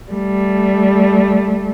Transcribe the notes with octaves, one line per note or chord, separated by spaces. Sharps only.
G3 A3